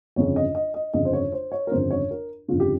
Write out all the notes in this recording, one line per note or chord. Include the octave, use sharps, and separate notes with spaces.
G1 F2 C#3 C#5
D#5
D#5
D#5
G1 F2 C#3 D#5
C5
C#5
C5
C#5
A#4
G1 F2 C#3 C5
C#5
A#4
G1 F2 C#3 F4
G4